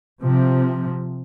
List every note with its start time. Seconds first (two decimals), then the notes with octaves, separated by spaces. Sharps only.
0.21 C3 F3